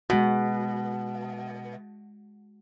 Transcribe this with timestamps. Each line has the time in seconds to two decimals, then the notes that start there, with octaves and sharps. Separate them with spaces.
0.10 B2 G#3 F#4